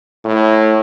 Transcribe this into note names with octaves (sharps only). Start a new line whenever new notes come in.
A2